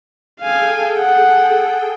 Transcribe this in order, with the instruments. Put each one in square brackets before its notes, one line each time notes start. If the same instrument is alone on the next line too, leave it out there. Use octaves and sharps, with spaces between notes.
[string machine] G#4 A4 G5 [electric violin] F5 G#5
[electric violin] F#5